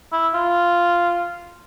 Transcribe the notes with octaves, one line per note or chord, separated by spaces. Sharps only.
E4
F4